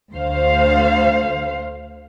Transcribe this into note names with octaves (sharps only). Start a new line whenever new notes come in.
D2 C5 F5